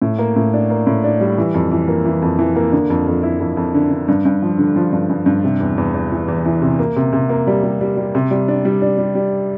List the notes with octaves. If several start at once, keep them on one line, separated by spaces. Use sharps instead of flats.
A2
A#3
A2
D4
A#3
A2
D4
G3
E3
F2
E3
A#3
E3
F2
E3
A#3
D3
F2
F2
E4
F2
F2
D3
D3
G2
G2
F3
D3
F3
G2
G2
G2
C3
E2
E2
E2
E3
E2
E3
C3
A#3
C3
C3
A#3
G3
G3
G3
G3
C3
G3
D4
G3
D4
G3
G3